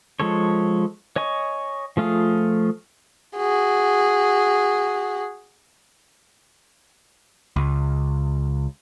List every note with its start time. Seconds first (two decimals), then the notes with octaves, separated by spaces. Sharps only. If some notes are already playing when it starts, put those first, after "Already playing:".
0.20 F3 G#3 A4 C#5
1.16 C#5 D#5 G#5 C#6
1.97 F3 A3 F4 G#4
3.37 F#4 G#4
7.56 C#2